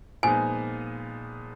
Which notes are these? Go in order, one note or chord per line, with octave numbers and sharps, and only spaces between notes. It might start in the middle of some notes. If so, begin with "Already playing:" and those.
A#2 F3 G#3 B3 D#4 G#5